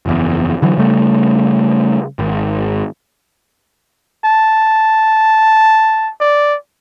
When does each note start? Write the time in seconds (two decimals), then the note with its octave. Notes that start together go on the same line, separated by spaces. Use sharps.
0.06 F#1 E2
0.62 D3 E3 F#3
0.77 C#3 G3 A3
2.19 G#1
4.24 A5
6.20 D5